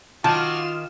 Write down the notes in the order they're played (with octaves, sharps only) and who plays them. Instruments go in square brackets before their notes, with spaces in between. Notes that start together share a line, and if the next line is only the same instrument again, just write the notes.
[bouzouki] D#3 [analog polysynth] F4 F6 E7 [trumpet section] F#4 D6 [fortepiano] A5